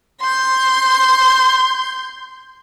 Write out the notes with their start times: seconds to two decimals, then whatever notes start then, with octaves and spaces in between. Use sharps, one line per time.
0.21 C6 G6